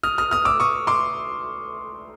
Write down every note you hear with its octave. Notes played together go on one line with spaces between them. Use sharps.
D#6 F6
D#6 F6
D#6 F6
D6 E6
C#6 D#6
C6 D6